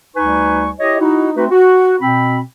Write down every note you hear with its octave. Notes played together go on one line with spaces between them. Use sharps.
D2 G3 D#4 B4 G#5 C#6
E4 G4 C#5 D#5
D#4 E4 F#4
A3 C4 D#4 F#4 B4
F#4
B2 C4 B5